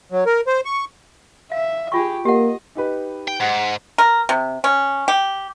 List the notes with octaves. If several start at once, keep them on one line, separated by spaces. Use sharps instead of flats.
F#3
A#4
C5
C#6
E5 F5
F4 G4 G#4 C#6
A#3 G4 D#5 F#5
D#4 G4 B4
G5
G#2 F#5
A#4
C3
C#4
G4